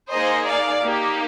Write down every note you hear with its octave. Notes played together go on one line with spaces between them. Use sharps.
A#3 D#4 G#4 C5 D#5
D5 F5
A#3 D#4 G4